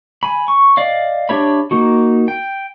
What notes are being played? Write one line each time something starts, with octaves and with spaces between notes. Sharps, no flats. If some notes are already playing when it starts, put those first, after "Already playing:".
G#5 B5
C#6
D5 D#5 F5
D4 G4 C#5 E5 B5
A#3 D#4 F#4
G5